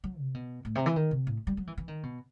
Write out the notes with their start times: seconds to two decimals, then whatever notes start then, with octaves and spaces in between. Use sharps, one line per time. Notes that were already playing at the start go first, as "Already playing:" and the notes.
0.04 F#3
0.19 C3
0.34 B2
0.65 A2
0.75 C3
0.86 E3
0.96 D#3
1.11 C3
1.27 A2
1.47 G3
1.57 F#3
1.67 E3
1.78 E3
1.88 D#3
2.03 B2